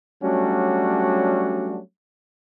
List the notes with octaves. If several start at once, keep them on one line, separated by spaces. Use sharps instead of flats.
F#3 G3 A3 C#4 D4 F#4